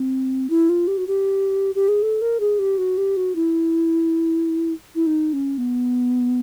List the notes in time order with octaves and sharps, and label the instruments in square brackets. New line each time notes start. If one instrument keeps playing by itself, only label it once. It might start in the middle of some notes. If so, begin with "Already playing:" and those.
Already playing: [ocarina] C4
E4
F4
G4
F#4
G4
G4
G#4
A4
A#4
G#4
G4
F#4
G4
F#4
E4
E4
D#4
C#4
B3